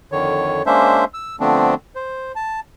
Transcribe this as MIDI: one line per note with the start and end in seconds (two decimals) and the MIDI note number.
0.12 0.62 41
0.12 0.62 50
0.12 0.62 51
0.12 0.62 73
0.66 1.04 56
0.66 1.04 58
0.66 1.04 61
0.66 1.04 62
0.66 1.04 72
0.66 1.04 76
1.14 1.36 88
1.40 1.74 50
1.40 1.74 53
1.40 1.74 57
1.40 1.74 59
1.40 1.74 60
1.40 1.74 62
1.96 2.32 72
2.35 2.60 81